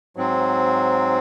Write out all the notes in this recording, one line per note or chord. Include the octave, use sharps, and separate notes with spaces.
G#2 F#3 C4